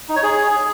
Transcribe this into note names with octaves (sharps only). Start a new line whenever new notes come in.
D#4
C#5
G#4